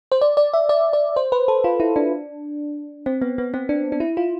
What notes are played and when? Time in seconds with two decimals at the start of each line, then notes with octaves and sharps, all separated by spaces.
0.12 C5
0.21 D5
0.37 D5
0.54 E5
0.69 D5
0.93 D5
1.16 C5
1.32 B4
1.48 A4
1.64 F4
1.80 E4
1.96 D4
3.06 C4
3.22 B3
3.38 B3
3.54 C4
3.69 D4
3.92 D4
4.00 E4
4.17 F4